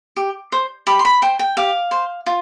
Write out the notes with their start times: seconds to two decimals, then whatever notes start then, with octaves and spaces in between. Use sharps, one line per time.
0.16 G4
0.52 C5
0.87 G4 B5
0.99 C6
1.05 B5
1.22 C5 G5
1.39 G5
1.57 G4 F5
1.91 C5
2.26 F4